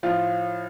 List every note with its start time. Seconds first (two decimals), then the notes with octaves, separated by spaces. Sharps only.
0.03 A2 F3 F4